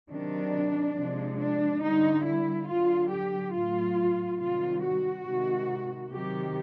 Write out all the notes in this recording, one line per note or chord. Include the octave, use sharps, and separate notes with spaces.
C3 D#3 F#3 D4
C3 F3 G#3
D4
D3 G3 D#4
E4
D3 F#3 F4
G4
A2 F#3 F4
C3 D#3 G3 F4
F#4
C3 D#3 G#3
C3 D#3 F#3 G4